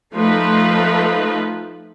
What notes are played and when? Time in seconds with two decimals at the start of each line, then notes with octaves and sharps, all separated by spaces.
0.14 F3 A3 D#4 B4